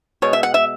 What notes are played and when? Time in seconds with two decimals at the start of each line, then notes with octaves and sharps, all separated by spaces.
0.22 B2 G#3 C#5
0.33 E5
0.43 F#5
0.54 E5